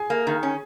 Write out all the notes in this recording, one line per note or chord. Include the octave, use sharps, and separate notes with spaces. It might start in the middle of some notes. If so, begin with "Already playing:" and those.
Already playing: G#4 G#5
A#3
D#3
C#4